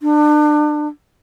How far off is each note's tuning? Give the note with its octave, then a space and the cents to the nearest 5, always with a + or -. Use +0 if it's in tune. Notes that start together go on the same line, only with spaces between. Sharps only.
D4 +30